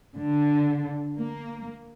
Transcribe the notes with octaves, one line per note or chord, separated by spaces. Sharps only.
D3
A#3